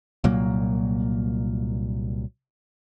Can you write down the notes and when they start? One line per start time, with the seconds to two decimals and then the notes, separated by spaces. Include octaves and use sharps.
0.24 C2 A#2 F#3 A#3